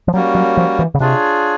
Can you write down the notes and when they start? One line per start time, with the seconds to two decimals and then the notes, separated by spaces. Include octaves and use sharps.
0.08 F3
0.14 F#3 G3 A#3 C#4 F#4
0.35 F#3
0.57 F3
0.79 E3
0.94 C#3
1.00 C3 D4 F4 G#4 C#5